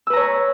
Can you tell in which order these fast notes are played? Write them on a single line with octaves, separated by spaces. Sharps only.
E6 B4 A#5 C#5